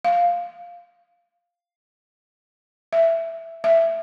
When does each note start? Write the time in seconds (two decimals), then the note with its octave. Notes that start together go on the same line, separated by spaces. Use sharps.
0.05 F5
2.93 E5
3.64 E5